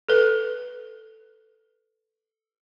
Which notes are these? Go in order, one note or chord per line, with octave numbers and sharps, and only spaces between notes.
A4 B4